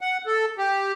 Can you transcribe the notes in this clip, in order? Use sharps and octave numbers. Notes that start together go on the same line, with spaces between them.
F#5
A4
G4